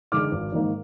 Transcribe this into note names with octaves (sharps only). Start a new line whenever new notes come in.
D3 G#3 D#4 D6 F6
G#1
G#2 D#3 A#3 D#4